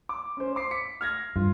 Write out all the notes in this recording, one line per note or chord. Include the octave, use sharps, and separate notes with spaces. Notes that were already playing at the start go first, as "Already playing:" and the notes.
D6
C#4 C5
C6 D6 C7
B6 C#7
F6 G#6 A#6
G2 F4